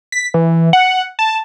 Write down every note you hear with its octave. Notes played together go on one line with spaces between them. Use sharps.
B6
E3
F#5
A5